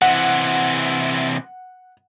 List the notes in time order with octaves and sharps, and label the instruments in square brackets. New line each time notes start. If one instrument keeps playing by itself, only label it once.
[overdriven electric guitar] C3 E3 [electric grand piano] F#5